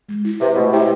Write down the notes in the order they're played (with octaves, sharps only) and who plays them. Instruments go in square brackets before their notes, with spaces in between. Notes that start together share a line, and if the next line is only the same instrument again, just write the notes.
[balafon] G#3
E4
[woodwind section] C3 [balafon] B4
[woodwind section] B2 [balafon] A3
[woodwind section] C3 [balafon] E4